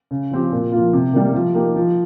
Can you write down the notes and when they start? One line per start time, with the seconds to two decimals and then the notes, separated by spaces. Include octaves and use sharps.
0.11 C#3
0.31 F3 C4 G4
0.52 A#2
0.72 F3 A#3 F4
0.93 C3
1.13 D#3 G3 A#3
1.34 F3
1.54 A#3 D#4 G4
1.76 F3